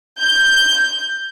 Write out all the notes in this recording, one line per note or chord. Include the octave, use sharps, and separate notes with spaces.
G6